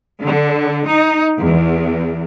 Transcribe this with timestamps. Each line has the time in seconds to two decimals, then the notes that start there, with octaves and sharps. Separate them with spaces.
0.22 D3
0.86 D#4
1.39 E2